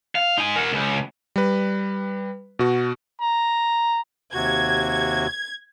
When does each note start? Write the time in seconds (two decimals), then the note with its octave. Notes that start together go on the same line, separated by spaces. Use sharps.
0.15 F5
0.38 D#4 G#5
0.56 A#4 F#5
0.73 C#2
1.36 G3 B4
2.59 B2 F#4
3.22 A#5
4.34 D#2 C3 F#4 G#6